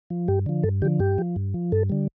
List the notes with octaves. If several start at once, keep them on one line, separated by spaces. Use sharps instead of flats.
F3
G2 G4
D3 F3
G2 A4
D3 F3 G4
G2 G4
F3
G2
F3
G2 A4
D3 G3